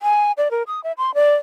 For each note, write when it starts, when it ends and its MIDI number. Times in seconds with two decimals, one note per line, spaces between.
0.02 0.32 80
0.38 0.51 74
0.51 0.63 70
0.67 0.83 87
0.84 0.92 76
0.98 1.14 84
1.14 1.35 74